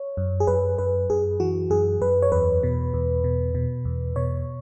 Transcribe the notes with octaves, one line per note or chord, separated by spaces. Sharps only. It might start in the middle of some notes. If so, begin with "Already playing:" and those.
Already playing: C#5
F#2
G#4
F#2 B4
F#2 B4
F#2 G#4
E3 F#4
F#2 G#4
F#2 B4
C#5
E2 B4
B2
E2
B2
B2
E2
B2 C#5